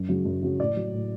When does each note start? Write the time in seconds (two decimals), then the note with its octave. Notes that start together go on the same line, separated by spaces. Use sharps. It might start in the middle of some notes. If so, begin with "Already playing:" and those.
Already playing: F#2
0.09 C#3 F#3
0.25 F#2
0.43 C#3 F#3
0.60 A2 D5
0.77 F#3
0.93 A2